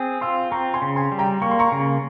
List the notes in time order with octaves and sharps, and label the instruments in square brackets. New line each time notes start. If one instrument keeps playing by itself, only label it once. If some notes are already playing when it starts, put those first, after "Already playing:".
Already playing: [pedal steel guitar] C4 G#4
[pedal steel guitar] F4 [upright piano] C6 E6
[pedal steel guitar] C4 [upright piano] A#5 C#6
[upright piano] G#5 C6
[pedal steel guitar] C#3
[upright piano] G#5 C6
[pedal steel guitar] G3
[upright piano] G5 A#5
[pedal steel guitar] A#3 [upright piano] C#6
[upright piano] C6
A#5 C#6
[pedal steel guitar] C#3